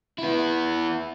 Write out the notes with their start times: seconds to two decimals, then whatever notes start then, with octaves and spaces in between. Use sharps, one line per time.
0.18 B3 E4